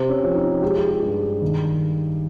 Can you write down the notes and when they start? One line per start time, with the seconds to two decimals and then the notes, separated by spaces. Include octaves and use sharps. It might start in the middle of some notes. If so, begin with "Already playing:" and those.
Already playing: C3 C4
0.09 C#4
0.23 F3
0.35 D#4
0.62 G#3 G4
0.76 F4
0.89 G4
1.03 G2
1.42 D#3